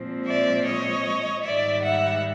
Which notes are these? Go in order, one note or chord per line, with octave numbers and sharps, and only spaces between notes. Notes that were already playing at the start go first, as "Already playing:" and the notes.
Already playing: A#2 F3 G#3 C4
D5 E5
C#5 D#5
G#2 D#3 G3 D5 E5
E5 F#5